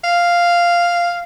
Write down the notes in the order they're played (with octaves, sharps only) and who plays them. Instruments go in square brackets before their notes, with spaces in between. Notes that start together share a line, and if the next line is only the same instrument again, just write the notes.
[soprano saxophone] F5